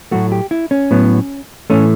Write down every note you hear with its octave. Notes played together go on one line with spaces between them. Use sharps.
A2 F#3 A3 F#4
G4
E4
C#4
A2 F#3 B3
A2 E3 A3 C#4